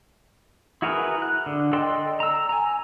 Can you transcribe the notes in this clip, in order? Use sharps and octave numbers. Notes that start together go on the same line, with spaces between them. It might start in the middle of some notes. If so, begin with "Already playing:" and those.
E4 F#4 G#4 A#4 B4
F#6
D3
A4 D5 D#5 G5 C6
A#5 E6
G#5 A#5